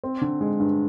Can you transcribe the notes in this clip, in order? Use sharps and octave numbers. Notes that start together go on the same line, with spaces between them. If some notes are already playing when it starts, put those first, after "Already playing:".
C4
D3
G#3
G2